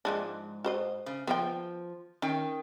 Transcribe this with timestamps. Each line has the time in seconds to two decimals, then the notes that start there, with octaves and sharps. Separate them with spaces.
0.05 G#2 F3 G#3 D4
0.64 F#4 C5 D#5
1.06 C#3
1.27 F3 B3 C4 G5
2.22 D#3 C#4 G5